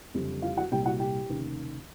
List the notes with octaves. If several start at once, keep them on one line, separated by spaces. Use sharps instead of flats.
F#1 F2 D3 G3
F4 F5
F#4 F#5
C2 A#2 G3 G4 G5
F#4 F#5
G4 G5
F1 D#2 C#3